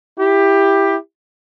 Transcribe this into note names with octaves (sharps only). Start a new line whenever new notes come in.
E4 G4